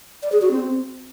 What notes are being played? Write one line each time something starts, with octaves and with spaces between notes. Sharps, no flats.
D5
G#4
F#4
C4